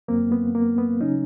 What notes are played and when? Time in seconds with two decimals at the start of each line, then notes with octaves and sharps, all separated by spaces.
0.08 F#2 D3 F#3 A#3 C4
0.32 B3
0.55 A#3
0.78 B3
1.01 C#3 F#3 C#4 D#4